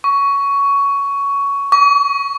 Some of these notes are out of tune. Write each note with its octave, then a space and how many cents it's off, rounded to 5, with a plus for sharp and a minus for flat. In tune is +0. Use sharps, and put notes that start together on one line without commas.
C#6 +15
C#6 +45